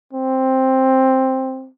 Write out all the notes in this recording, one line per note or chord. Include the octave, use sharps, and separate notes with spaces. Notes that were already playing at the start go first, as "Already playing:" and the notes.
C4